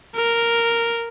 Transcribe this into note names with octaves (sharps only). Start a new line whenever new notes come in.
A#4